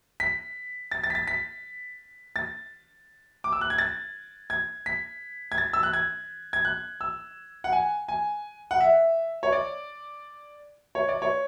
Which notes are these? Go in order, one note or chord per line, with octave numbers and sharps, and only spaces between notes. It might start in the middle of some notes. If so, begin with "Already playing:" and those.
B6
A6
A6
B6
A6
B6
A6
D6
E6
F#6
G#6
A6
G#6
B6
G#6
A6
E6
F#6
G#6
G#6
F#6
E6
F#5
G#5
G#5
F#5
E5
C#5
D5
C#5
D5
C#5